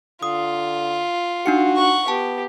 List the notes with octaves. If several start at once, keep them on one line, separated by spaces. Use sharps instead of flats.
D3 F4 D#6
D4 D#4 F#4 C#7
F#5 C#6
B3 G4 A5